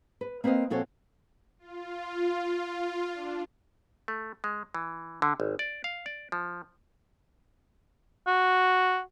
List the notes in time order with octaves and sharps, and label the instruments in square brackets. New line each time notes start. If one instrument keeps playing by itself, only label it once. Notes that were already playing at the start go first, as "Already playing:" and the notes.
[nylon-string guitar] B4
A#3 C4 B4 D5 D#5 F5
A#2 F3 C4 F#4 A4 C#5
[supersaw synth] F4
D4
[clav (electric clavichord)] A3
G#3
E3
D3
G#1
D5
F5
D5
F3
[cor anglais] F#4